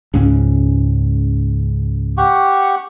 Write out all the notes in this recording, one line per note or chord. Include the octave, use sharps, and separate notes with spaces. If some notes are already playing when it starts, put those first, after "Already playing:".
C#2 G#2 C#4
G4 F#5 C#6